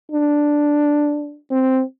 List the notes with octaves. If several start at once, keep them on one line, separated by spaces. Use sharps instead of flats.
D4
C4